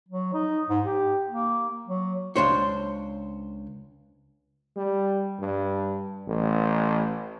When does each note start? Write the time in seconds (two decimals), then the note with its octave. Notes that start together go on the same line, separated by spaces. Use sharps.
0.09 F#3
0.34 D#4
0.70 G#2
0.85 G4
1.30 A#3
1.87 F#3
2.36 C#2 F#2 D4 C5 C#5
4.76 G3
5.40 G2
6.28 A1